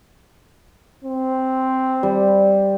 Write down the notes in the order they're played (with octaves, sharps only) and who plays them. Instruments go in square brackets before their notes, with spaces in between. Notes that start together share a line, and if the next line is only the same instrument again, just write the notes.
[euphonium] C4
[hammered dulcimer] G3